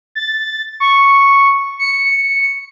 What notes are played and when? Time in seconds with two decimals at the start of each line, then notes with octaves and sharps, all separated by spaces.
0.15 A6
0.80 C#6
1.79 C#7